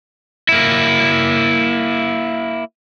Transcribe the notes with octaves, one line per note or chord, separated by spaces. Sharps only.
A#3 E4